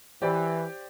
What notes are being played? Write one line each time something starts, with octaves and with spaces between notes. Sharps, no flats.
E3 G4 C5 D5